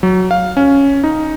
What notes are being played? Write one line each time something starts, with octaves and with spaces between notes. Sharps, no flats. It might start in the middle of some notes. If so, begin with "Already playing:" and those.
F#3
F5
C#4
D#4